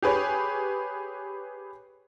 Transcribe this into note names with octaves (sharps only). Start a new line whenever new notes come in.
G4 G#4 B4 C#5